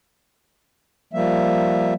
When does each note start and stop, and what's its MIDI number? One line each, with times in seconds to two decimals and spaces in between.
1.13 1.94 53
1.13 1.94 55
1.13 1.94 58
1.13 1.94 76